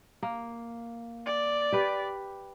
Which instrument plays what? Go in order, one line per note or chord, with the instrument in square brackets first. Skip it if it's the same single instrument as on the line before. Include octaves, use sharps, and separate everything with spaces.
[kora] A#3
[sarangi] D5
[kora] G4 B4